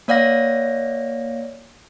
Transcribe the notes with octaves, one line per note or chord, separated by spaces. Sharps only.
A#3 C#5 D5 F5 F#5 A#6